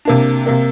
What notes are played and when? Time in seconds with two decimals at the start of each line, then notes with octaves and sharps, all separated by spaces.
0.05 C3 A#3 D4
0.46 C3 A#3